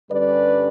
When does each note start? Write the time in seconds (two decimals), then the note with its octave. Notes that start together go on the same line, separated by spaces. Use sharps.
0.10 G2 D3 G3 C#4 B4 D5